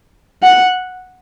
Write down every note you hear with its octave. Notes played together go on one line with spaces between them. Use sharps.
F#5